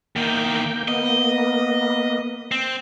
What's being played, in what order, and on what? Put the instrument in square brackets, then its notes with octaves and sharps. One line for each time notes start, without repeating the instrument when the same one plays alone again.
[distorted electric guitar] E2 D#3 [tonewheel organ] A#3 G5
[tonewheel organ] A#3 B3 [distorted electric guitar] D#5
[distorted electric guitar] C4